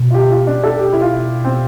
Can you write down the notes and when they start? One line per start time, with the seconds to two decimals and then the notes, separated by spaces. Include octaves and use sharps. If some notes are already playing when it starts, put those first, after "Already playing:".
Already playing: B2
0.10 F4
0.14 G4
0.30 F4
0.47 D4
0.63 A4
0.79 G4
0.93 E4
1.01 F4
1.45 C4